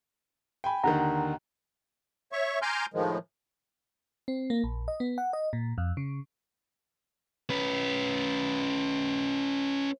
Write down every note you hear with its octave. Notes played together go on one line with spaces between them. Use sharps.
G5 G#5 B5
D#2 D3 D#3 F#5 A#5
C#5 E5 C#6
G#5 A#5 C6 D6 F6 G6
A2 D#3 F3 G#3
C4
A#3
A#1
D#5
B3
F#5
D#5
A#2
F2
C#3
C#4 B4